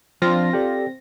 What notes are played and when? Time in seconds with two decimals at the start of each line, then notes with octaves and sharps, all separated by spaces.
0.22 F3 C4 D4 F4 A#6
0.53 G4 A4 D5 G5